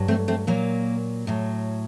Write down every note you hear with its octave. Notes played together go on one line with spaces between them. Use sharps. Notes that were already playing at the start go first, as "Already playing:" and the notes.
Already playing: G2 F#3
A3 C4
A3 C4
A#2 F#3 A#3
A2 F#3